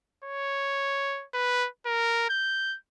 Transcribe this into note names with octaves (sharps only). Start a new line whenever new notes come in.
C#5
B4
A#4
G6